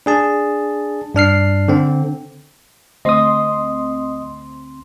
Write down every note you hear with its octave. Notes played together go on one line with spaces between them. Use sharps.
D4 G#4 A5
G2 D4 F6 C7
D3 C4
D2 C4 D#5 C6 D#6